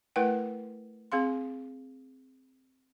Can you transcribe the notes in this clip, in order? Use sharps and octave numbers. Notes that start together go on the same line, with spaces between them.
A3 E4 A#4 B4 F#5 G5
C4 G#4 F5 C6